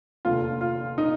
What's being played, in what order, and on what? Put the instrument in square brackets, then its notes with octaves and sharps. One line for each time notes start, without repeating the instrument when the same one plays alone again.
[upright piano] F1 D#2 D3 F4
F4
D#4